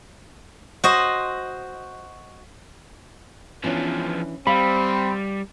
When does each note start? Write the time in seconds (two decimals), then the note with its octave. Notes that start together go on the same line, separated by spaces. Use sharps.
0.84 F#4 C5 D#5
3.64 E3 F3 B3 C#4 D4
4.47 G3 C4 F5 B5